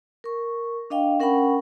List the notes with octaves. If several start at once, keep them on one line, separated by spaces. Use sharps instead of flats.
A#4 C#6
D4 D#5 F5 G5
C#4 A#4 F#5 G5 B5 C#6